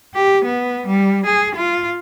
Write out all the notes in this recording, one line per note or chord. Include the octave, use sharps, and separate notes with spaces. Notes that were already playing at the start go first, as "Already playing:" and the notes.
G4
B3
G3
G#4
F4